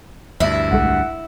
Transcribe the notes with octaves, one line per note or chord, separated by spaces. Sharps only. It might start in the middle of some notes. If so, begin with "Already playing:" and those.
D2 G2 E4
B1 G#3 A3 F#5